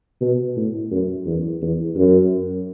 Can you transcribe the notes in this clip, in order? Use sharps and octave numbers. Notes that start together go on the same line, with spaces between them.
B2
A2
F#2
E2
E2
F#2